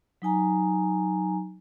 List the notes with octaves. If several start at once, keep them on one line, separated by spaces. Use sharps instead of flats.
F#3 D#4 G#5 A#5